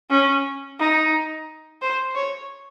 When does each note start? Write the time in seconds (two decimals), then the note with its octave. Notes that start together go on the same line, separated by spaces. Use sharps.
0.10 C#4
0.79 D#4
1.82 C5
2.15 C#5